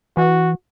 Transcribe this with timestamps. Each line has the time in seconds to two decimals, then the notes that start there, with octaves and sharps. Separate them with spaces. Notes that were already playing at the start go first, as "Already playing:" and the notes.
0.17 E3 F#4